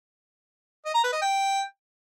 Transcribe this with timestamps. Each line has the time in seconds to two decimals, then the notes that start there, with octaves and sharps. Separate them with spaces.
0.86 D#5
0.95 A#5
1.04 B4
1.13 D#5
1.22 G5